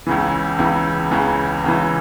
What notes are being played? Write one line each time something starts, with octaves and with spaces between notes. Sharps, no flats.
C#2 C#3 E3
C#2 C#3 E3
C#2 C#3 E3
C#2 C#3 E3